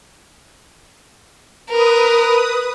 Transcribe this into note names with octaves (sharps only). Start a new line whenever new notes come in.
A#4 B4 D#6